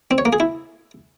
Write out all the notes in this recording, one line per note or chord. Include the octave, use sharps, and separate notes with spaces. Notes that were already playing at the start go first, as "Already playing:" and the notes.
C4
C#5
A#3
G#4
E4